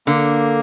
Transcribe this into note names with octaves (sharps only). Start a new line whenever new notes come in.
D3 A#3